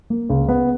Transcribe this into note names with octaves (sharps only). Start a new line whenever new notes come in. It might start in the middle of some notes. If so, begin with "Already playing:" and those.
A#3
C#2
B3